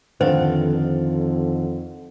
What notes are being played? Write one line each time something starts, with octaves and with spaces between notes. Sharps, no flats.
F2 D3 D#3 A4 C5 F5